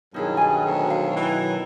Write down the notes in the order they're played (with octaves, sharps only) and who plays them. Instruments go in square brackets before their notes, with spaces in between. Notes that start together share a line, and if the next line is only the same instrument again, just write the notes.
[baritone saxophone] G2 [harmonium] B2 D#3 F#3 [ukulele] D#4 E4 G#4
[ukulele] G#4 G#5
[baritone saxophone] D2
[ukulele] F5
[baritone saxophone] E3